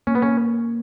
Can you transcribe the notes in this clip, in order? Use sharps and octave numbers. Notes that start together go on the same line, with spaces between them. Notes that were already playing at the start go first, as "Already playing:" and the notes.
A#3 C#4
B3
C#4